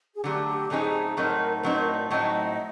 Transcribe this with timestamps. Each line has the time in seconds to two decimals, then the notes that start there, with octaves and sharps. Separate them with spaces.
0.15 G#4
0.24 D3 F#3 A3 G4
0.47 G4
0.70 A2 F#3 A3 C4 D#4 G#4
1.17 A2 F#3 A3 C4 D#4 A#4
1.55 C5
1.63 A2 F#3 A3 C4 D#4 B4
1.79 A#4
1.95 D5
2.10 A2 F#3 A3 C4 D#4 D#5